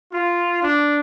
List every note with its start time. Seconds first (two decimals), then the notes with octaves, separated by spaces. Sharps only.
0.12 F4
0.63 D4